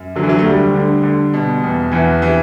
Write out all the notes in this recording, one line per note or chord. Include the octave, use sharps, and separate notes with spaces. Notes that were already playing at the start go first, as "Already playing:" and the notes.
Already playing: F#2
D3 F#3
E3
F#3
A3
D2 G3
D3
D3
B2
E2
E2 E3
C3 E3